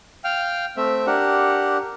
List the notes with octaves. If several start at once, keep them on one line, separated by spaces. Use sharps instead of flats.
F5 G5 F6
A3 C4 E5
D4 G4 A#4 F#5